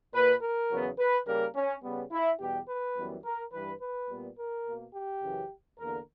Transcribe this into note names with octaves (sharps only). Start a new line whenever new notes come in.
A#2 A#3 B4
A#4
E2 C#3 F#3 B3
B4
C#3 G3 A#3 A#4
C#4
C#3 G3 B3
E4
E2 B2 G3 G4
B4
F#2 E3 G3 B3
A#4
G2 E3 G3 B4
B4
A#2 G3 B3
A#4
B2 A#3
G4
F#2 C#3 E3
E2 D3 A#3 A#4